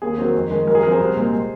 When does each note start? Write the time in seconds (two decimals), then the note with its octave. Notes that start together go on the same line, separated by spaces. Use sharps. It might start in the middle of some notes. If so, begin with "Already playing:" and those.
0.02 D#2 G#4
0.18 D#3 F#3 C4
0.34 F2
0.50 D#3 G#3
0.67 F#2 A#4
0.75 G#4
0.83 F3 C4 A#4
0.92 G#4 C5
1.00 C2
1.16 A#2 G#3 C4